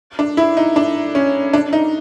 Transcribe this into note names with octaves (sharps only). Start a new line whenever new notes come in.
D4
E4
D#4
D4
C#4
D4
D#4